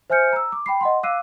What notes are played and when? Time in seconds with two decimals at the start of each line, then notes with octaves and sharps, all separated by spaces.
0.10 C5 E5 G#5 F6 G6 C#7
0.33 A#5 E6
0.52 D6
0.66 G5 B5 C7
0.81 D#5 F#5 C6
1.03 F5 D6 E6 F#6 C7 D#7